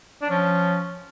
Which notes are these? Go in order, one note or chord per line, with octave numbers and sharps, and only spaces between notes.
D4
F3 C#4